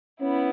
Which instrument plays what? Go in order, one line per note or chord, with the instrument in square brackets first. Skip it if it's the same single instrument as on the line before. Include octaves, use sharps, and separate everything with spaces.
[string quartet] B3 E4 [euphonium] C#4